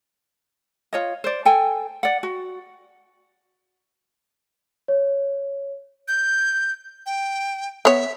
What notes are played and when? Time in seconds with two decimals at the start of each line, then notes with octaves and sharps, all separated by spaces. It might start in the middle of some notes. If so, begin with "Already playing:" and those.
0.93 F4 C#5 D#5
1.24 C5 D5
1.45 A4 G5 G#5
2.03 D5 F#5
2.23 F#4
4.88 C#5
6.08 G6
7.06 G5
7.85 B3 C#5 E5